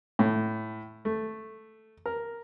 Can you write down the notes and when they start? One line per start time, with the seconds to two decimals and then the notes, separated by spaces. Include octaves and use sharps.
0.19 A2
1.05 A3
2.06 A#4